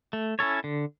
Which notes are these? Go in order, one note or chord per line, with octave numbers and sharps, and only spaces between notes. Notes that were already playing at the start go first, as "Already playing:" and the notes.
A3
C#4 E4 A4 C#5
D3